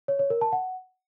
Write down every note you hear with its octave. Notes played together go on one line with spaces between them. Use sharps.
C#5
C#5
A#4
A5
F#5